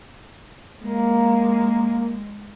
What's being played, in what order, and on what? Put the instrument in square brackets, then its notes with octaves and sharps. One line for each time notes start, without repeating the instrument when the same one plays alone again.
[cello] G#3 [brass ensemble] A#3